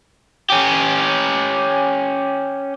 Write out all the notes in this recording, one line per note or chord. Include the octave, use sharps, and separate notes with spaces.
C#4 G4